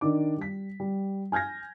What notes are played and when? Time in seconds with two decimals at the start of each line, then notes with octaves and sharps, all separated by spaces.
0.01 D#3 D4 D6
0.38 G3 B6
0.80 G3
1.32 G#5 F6 G6 G#6 A#6